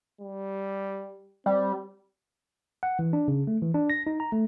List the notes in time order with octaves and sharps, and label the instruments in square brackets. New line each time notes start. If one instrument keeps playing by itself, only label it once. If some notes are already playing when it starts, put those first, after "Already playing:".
[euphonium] G3
[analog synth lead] G3 [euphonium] C4
[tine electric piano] F#5
E3
D4
C#3
A3
E3
D4
A#6
D#4
A#5
A3